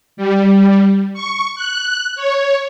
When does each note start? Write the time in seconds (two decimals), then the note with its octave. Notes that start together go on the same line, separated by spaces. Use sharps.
0.17 G3
1.14 C#6
1.55 F#6
2.16 C#5